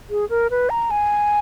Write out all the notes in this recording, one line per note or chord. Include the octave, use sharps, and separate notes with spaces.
G#4
A#4
B4
A#5
G#5